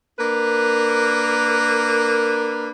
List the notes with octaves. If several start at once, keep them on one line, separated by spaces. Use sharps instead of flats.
A#3 D4 A#4 B4